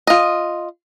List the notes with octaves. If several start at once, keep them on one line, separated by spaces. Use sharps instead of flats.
F4 D#5